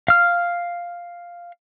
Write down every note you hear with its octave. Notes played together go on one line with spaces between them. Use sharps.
F5 F6